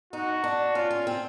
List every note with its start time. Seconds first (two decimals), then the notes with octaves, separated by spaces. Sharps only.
0.13 D#4 F#4
0.44 D4
0.75 C#4 F4
0.91 C#4
1.07 C4